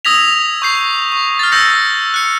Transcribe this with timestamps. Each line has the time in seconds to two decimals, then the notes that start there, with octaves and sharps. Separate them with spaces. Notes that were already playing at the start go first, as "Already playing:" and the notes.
0.05 D#6 E6 G#6 A#6 B6 F7
0.62 C#6 G6 C7
1.12 C#6
1.39 F6 A6
1.52 E6 G6 A#6 C#7
2.14 F#6 C#7